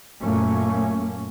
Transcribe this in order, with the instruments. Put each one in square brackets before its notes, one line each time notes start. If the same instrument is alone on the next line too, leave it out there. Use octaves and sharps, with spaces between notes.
[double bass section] F#2 A#2 A3 A#3 C#4